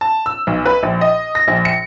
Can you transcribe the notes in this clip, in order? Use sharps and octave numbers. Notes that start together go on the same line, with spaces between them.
A5
E6
B1
B4
A#1
D#5
A#6
A#1
C#7